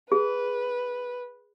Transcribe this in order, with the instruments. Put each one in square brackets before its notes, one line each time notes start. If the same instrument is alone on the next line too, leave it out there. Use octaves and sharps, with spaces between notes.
[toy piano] G#4 [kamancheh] B4